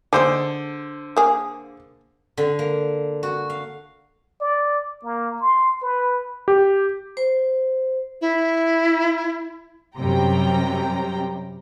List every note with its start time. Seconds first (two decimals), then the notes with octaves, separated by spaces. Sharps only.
0.13 D3 G#3 D4 C5
1.17 A#3 G#4
2.37 D3
2.59 A#3
3.23 F#4
3.50 F5
4.41 D5
5.04 A#3
5.41 C6
5.82 B4
6.48 G4
7.17 C5
8.21 E4
9.98 F#2 C3 G3 G5 A#5